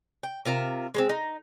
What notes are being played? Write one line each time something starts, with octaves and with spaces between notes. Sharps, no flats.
G5
C3 F4 A#4 E5
G#3 A#3 C4
D#4